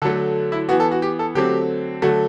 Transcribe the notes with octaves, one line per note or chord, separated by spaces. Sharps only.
D3 F#3 A3 A4
E4
E3 B3 F#4
A4
F#4
G4
A4
D3 F#3 A3 C4 G4
D3 F#3 A3 F#4